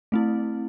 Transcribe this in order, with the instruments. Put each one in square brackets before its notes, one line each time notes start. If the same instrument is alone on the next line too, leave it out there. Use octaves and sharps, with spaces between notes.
[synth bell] A3 C4 E4